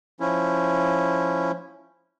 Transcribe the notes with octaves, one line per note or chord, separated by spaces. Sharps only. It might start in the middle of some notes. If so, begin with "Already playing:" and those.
F3 C#4 E4